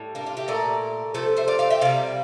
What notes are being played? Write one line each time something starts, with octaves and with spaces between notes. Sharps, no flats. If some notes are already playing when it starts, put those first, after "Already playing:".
Already playing: A2 G3
A#3 D4
D4 F4
E4 G4
A#2 A3 A#4 D5
C3 F3 A3 A4 C5
C5 E5
D5 F5
D5 F5
E5 G5
C3 G3 D5 F5